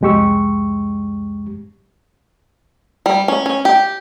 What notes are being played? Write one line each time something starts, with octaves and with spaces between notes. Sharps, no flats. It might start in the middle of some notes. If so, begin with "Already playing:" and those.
C2 F2 G#3 G4 C#6 E6
G3
C#4
C#4
G4